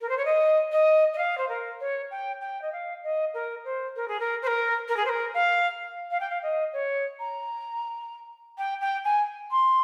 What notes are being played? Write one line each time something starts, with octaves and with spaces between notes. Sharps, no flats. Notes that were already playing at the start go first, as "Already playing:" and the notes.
A#4
C5
C#5
D#5
D#5
D#5
F5
C5
A#4
C#5
G5
G5
D#5
F5
D#5
A#4
C5
A#4
G#4
A#4
C5
A#4
A#4
G#4
C5
A#4
F5
F5
G5
F5
D#5
C#5
A#5
G5
G5
G#5
C6